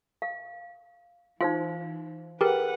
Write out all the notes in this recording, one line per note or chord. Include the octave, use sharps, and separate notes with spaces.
F5
E3 D#4 F4 C5 F5
G4 G#4 A#4 B4 F#5 G5